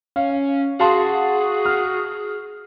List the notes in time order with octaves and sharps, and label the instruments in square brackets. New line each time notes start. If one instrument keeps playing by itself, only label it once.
[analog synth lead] C#4 [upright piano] F5
[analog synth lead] F#4 [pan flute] G#4 [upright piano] F5 A5 C6
[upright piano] F6